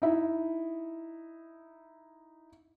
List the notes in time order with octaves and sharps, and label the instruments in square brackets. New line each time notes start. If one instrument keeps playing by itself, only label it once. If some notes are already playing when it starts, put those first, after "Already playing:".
[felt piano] D#4 E4